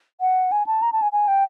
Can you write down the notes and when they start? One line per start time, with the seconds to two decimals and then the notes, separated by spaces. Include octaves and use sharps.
0.21 F#5
0.52 G#5
0.67 A5
0.82 A#5
0.93 A5
1.02 G#5
1.12 G#5
1.28 G5